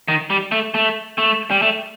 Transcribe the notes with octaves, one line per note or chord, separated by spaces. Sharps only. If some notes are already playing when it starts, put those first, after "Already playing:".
D#3
G3
A3
A3
A3
G3
A3